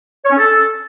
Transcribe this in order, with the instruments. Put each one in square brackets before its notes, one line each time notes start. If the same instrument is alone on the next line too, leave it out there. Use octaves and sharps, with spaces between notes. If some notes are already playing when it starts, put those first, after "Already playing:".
[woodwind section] C#5
C#4
A4